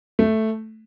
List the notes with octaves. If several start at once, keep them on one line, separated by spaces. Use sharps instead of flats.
A3